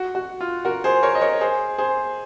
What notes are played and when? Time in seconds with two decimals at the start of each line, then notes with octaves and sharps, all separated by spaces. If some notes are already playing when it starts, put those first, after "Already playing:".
Already playing: F#4
0.15 F#4
0.41 F4
0.65 F#4 A#4
0.84 G#4 C5
1.03 A#4 C#5
1.15 D#5
1.21 A#4 C#5
1.41 G#4 C5
1.78 G#4 C5